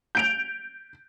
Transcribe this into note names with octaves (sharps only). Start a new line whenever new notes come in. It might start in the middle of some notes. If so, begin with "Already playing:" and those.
G6 D7 F7